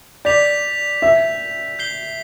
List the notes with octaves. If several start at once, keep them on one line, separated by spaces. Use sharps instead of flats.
D5 G6 B6 F7
E5
G6 C7 G7